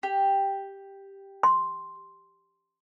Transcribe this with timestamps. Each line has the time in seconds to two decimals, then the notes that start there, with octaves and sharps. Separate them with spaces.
0.03 G4
1.43 C6